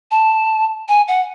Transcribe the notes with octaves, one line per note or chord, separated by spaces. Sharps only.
A5
G#5
F#5